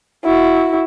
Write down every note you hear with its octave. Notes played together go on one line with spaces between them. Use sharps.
E4 F#4